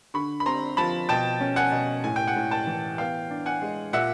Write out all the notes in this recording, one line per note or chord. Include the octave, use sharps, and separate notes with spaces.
D3 B5 C#6
B5
C4 A#5 C6
F3 A5 B5
B2 G5 A5
C#4
F#5 G#5
B2
A2 G#5
G5
F#5 G#5
A2
G5 A5
E3
B3 F5 G5
D4
F#5 G#5
G#3
A#2 E5 F#5